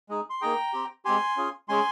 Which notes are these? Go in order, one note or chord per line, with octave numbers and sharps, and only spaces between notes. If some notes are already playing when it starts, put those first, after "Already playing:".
G#3 D#4 G#4
C6
A#3 D#4 G#4 G5 A#5
C4 G4
G#3 C4 G4 G#5 C6
C#4 F4 G#4
G#3 C#4 G#4 G#5 C6